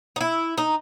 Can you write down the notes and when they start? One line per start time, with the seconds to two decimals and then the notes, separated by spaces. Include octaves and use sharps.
0.16 D#4
0.21 E4
0.58 D#4